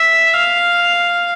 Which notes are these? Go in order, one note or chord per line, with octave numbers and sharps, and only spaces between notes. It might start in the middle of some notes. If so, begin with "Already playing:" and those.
Already playing: E5
F5